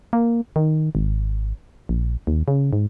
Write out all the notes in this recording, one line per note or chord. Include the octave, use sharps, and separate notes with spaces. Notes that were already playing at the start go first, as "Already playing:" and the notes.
A#3
D#3
G#1
A#1
D#2
C#3
G#2